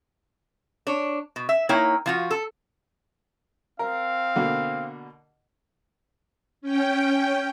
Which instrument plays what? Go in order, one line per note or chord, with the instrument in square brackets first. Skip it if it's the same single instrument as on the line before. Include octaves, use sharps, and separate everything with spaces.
[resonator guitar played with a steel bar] D4 C#5
B2
E5
A#3 D#4 E4 C#5 G5
F3 F4 F#4
A4
[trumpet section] C4 F5 [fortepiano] A#4
[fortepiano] B2 D3 A#3
[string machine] C#4 G5